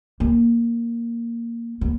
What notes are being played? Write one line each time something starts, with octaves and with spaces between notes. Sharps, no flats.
A#3
A#3